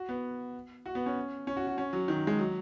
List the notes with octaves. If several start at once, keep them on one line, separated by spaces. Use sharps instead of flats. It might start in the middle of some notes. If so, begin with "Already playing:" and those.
Already playing: F#4
B3
F#4
B3
C#4
C#4
F#4
F#4
C#4
F#3
D#3
G#3
F#3